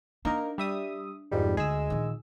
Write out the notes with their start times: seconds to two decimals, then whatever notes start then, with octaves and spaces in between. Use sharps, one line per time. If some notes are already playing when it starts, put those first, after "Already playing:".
0.25 A#3 D4 D#4 A#4
0.58 G3 E5 D#6
1.31 F2 G#2 D#3 G3
1.57 D2 G#3 G#4 E6
1.90 A#1 D#3